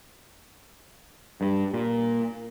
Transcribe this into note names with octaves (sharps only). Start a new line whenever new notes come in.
G2
A#2